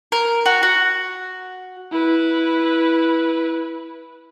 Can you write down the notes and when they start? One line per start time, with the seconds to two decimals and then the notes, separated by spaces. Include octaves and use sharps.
0.12 A#4
0.46 F#4
0.63 F#4
1.92 E4 B4